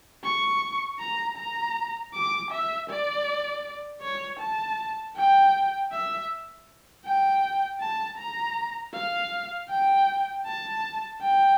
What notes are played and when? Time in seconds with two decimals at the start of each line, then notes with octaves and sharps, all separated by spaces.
0.24 C#6
1.00 A#5
1.38 A#5
2.14 D6
2.51 E5
2.90 D5
4.02 C#5
4.40 A5
5.16 G5
5.92 E5
7.05 G5
7.81 A5
8.18 A#5
8.94 F5
9.69 G5
10.46 A5
11.21 G5